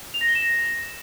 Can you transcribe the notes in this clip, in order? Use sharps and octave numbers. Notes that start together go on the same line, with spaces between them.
F7
A#6
G7
E7
A#6